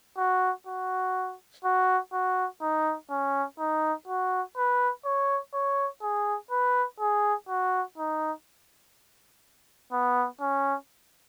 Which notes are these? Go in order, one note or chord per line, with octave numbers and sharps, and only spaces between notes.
F#4
F#4
F#4
F#4
D#4
C#4
D#4
F#4
B4
C#5
C#5
G#4
B4
G#4
F#4
D#4
B3
C#4